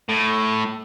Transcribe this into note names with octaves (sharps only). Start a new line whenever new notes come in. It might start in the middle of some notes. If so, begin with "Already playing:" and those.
A2